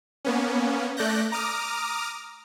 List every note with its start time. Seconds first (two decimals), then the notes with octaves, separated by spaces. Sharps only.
0.25 A#3 B3 C#4
0.97 A3 D5 F#6 G6 A#6
1.32 A#5 D6 D#6 F6